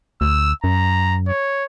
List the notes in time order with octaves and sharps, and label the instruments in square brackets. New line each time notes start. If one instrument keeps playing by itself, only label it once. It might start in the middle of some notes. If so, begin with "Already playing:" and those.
[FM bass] D2 [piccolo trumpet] E6
[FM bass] F#2 [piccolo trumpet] A#5
[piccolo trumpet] C#5